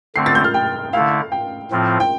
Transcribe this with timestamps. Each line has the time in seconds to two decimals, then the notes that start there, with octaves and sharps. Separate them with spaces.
0.16 D3 A3 C4 C7
0.26 A6
0.35 G6
0.44 F6
0.54 G5
0.93 D3 A3 E4 F5
1.32 G5
1.71 A2 F3 C4 F4
2.00 G5